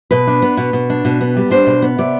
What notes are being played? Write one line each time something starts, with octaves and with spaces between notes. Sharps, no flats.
B2 B4
D4
B3
B2
B2
D4
B2
B3
G3
D4 C5
B2
B3
C3 D5